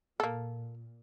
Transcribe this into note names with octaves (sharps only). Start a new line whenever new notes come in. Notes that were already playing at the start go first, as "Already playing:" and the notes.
A#2 A#3 A4